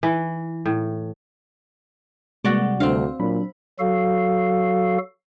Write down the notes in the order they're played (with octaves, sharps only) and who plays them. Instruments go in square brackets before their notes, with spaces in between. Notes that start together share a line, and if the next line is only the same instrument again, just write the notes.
[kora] E3
A2
[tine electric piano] C3 G3 [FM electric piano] G#3 A#3 [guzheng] F#4 D5
[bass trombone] D2 [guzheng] C4 F5 [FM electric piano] D4 C5
[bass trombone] A#2 [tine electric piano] F#3 D4 [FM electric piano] B5
[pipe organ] F#3 F#4 A4 F5